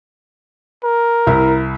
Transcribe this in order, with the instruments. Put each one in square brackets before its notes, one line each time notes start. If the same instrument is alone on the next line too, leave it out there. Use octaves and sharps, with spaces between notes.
[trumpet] A#4
[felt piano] C2 E4